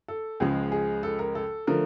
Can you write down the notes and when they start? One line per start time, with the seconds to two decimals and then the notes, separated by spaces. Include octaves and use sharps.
0.08 A4
0.40 C#2 C#3 F3 G#3 G#4
0.72 G#4
1.03 A4
1.19 A#4
1.35 A4
1.67 D3 F3 A3 A#4